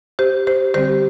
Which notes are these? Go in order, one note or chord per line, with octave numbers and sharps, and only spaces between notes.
G4 C5
G4 C5
D3 G3 C4 G4 C5